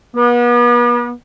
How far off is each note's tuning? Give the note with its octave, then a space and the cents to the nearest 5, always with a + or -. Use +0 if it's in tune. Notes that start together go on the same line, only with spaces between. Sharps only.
B3 -40